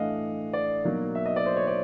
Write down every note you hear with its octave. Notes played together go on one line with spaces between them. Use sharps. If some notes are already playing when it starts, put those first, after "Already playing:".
Already playing: A2 E3 A3 D4 D#5 F5 F#5
D5
B2 F#3 A#3 D#4
E5
D#5
D5
C5
C#5
D5